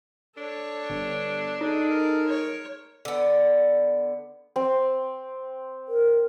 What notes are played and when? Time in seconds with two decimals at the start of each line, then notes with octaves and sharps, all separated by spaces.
0.37 D4 A4 C#5
0.90 G1
1.61 D#4 G#4 A4
1.91 A#4
2.28 C#5
3.05 D3 B3
4.56 C4
5.88 A#4